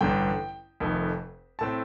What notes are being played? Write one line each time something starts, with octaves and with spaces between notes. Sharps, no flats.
A1 G2 D3 G5
F1 F2 D#3 A3
A2 A3 C4 A5